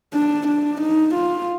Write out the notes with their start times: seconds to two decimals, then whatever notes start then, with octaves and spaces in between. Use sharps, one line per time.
0.14 D4
0.48 D4
0.81 D#4
1.14 F4